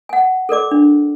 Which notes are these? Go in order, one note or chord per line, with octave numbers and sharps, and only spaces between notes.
F#5 G#5
A4 A#4 D5 D6
D4